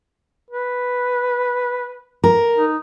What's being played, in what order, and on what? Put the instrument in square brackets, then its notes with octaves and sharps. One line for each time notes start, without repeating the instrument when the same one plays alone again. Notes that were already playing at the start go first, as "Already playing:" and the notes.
[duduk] B4
[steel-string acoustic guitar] A#4
[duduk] D#4